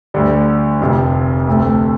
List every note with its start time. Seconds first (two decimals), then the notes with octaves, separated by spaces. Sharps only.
0.14 D2 D3 G3
0.81 F1 F2 C3
1.47 D2 C3 A3